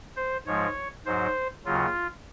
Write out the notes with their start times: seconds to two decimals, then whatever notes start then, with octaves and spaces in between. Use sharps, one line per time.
0.17 C5
0.46 G#2 F3 G#3 C#5
1.06 G#2 F#3 C5
1.65 D#2 C#3 F#3 F4